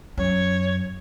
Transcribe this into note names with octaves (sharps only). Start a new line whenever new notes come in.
F#2 C#5